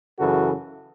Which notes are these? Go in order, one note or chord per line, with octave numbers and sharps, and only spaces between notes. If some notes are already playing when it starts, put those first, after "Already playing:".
F#2 C#3 E3 F#4 A4